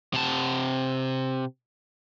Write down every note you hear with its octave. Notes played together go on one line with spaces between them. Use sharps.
C3 A5